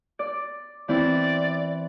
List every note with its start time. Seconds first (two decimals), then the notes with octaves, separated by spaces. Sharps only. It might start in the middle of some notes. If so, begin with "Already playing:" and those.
0.19 D5
0.88 E3 C4 E4 D5